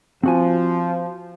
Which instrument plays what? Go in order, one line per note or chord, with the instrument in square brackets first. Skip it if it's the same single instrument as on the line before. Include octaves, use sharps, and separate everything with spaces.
[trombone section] F3 [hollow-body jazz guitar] C4 F#4 G#5